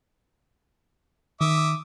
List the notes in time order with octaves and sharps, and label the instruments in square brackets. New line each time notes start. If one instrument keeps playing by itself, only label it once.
[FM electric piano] D#3 [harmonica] E5 D6 D#6